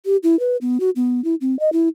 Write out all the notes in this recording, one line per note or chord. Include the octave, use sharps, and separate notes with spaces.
G4
E4
B4
B3
F#4
B3
E4
C4
D#5
E4